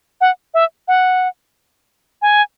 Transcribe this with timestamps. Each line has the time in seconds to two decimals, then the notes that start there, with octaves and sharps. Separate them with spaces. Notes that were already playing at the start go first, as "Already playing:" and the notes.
0.21 F#5
0.54 E5
0.88 F#5
2.22 G#5